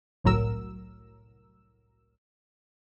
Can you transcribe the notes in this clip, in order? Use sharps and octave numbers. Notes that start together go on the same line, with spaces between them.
G1 C2 A2 F#3 A#4 E6